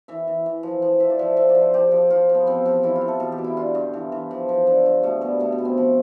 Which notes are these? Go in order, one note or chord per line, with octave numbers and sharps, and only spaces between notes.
E3 E5
E3
E3
F3
F3
F3 E5
D5
F3 E5
F3 E5
D5
F3
C5
F3 G4
F3
F3 F4
F3
B3
F3 C4
F3
E3 E4
F4
E3
A4
B2 A4
G4
B2
E4
D3 F4
G2
E3
E3
F3
F3
D3
G2
B2 A3
B2 G3
B2 A3
B3
B2
C4
F3